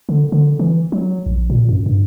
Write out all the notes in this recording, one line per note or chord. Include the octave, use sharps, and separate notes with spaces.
D3
D3
E3
F#3
A#1
A#2
F#2
G2